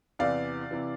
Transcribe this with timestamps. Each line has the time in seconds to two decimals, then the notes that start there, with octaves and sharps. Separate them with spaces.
0.19 E2 C3 E3 D5 F5
0.71 C3 E3